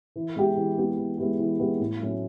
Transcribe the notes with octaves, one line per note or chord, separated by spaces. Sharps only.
E3
G#3 B3 E4 G4
E3
G#3 B3 E4 G4
E3
G#3 B3 E4 G4
E3
G#3 B3 E4 G4
A2
F#3 A3 C#4